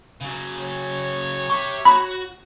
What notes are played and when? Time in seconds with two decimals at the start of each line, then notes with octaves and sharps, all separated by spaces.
0.21 C#3 F#3
0.60 C#5
1.49 G4 E5 C#6
1.85 F#4 B5